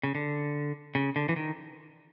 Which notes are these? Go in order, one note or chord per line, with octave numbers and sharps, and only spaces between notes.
C#3
D3
C#3
D3
E3
D#3